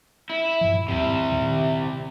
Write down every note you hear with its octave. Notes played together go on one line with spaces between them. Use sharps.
E4
G2 A#2 F3
D#2 G#2 C3 E4
A#2 D#3